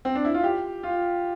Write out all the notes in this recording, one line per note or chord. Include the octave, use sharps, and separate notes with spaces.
C4
D4
E4
F4
G4
F4